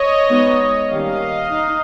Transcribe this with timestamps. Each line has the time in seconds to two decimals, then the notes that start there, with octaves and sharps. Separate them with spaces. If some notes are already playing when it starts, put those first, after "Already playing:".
Already playing: C#5 D#5
0.29 G#3 B3 D#4
0.90 D#3 G3 A#3 C#4 D#5 F5
1.52 D#4